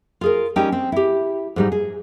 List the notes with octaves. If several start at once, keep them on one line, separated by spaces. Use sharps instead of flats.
F4 G#4 A#4
G3 C#4 D#4 G4 G5
C4
E4 G4
G#2 G3 D#4
G#4